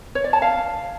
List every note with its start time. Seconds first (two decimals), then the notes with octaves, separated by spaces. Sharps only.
0.15 C#5
0.24 D5
0.33 A5
0.42 F5